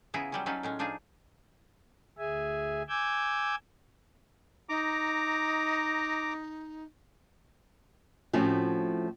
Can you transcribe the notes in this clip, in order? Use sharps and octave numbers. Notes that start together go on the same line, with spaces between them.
C#3 B3 E4 F4 G#4 A#5
F#3 G3 C#4
F#3 C#4 D#4 A4 B4 F5
A2 G#3 C#4
F3 D4 D#4 F4 G#4
D2 G#4 E5 G#5
G#5 D6 E6 G6 G#6
D#4 A#5 D6
A2 F3 A3 C4 C#4 F#4